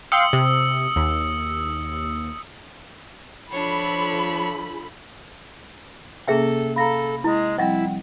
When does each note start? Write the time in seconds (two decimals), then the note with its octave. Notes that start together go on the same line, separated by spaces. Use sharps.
0.12 F5 G5 C6 D#6 E6 C#7
0.33 C3
0.96 D#2
3.51 F3 D4 A4 C#5 B5
6.28 C3 A#3 C#4 G#4 A4 E5 G5
6.76 A4 F5 A#5 B5 A#6
7.24 G#3 E4
7.58 F3 G3 C4 E4 D#5 F#5 G5